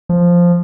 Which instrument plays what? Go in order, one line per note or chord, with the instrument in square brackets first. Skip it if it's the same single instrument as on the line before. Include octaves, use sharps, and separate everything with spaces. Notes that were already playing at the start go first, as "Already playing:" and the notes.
[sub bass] F3